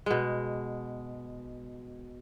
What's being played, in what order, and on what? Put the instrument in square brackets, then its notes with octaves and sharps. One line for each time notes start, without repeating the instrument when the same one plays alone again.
[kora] B2 G#3